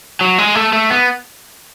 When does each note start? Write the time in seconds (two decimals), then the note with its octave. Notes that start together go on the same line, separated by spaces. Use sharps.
0.21 F#3
0.38 G#3
0.55 A3
0.73 A3
0.90 B3